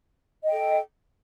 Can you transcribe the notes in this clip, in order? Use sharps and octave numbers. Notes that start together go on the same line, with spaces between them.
A4 D#5 G5